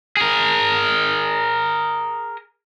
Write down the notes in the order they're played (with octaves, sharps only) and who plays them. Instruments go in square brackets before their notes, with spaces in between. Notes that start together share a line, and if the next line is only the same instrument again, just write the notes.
[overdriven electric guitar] G#4 A#4